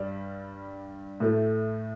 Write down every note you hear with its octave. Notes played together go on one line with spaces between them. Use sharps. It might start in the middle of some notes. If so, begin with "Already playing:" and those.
Already playing: G2 G3 D4
A2 A3 E4